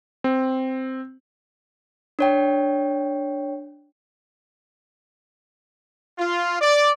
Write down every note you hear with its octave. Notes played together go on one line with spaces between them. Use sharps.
C4
D4 C#5 G5
F4
D5